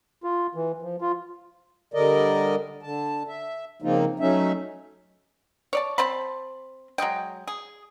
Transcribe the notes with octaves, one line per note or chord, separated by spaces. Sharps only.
F4
E3
F3
F4
D3 G3 A#4 D5 D#5
D3 A5
E5
C#3 F3 A#3 C4 D#4 F4
F#3 A3 C#4 D#4 E5
C#5 D5 A5
C4 C5 A5 B5
F#3 G#3 D#5 G5
G#4